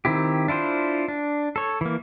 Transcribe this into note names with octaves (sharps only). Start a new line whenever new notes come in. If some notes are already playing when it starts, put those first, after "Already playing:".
D#3 C4 E4 G4
D4 E4 F4 C5
D4
A4 C#5
E3 A#3